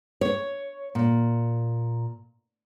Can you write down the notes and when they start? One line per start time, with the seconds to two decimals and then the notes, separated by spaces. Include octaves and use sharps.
0.21 C#5
0.95 A#2